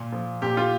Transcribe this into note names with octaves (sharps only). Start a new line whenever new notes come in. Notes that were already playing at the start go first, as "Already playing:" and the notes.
Already playing: A#2
F3
A#2 G4
F4